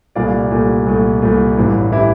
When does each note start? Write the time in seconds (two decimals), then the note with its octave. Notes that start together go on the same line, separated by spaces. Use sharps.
0.15 C2 A#2 A3 D5 F5
0.51 C2 A#2 A3
0.87 C2 A#2 A3
1.22 C2 A#2 A3
1.57 A1 G2 E3
1.92 E3 E4 G4